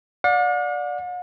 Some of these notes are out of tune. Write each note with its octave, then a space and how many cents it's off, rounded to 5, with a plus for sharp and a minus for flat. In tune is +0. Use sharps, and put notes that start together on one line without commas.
D5 +0 F#5 -45